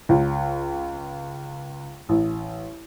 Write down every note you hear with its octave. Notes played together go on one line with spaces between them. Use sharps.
C#2
A1